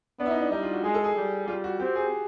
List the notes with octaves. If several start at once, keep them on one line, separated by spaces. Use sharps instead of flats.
B3 D4
E4
D#4
D4
G3 D#4
F4
F#4
G#3 G#4
A4
G#4
G3
G3 F4
F#4
C4 G4
G#4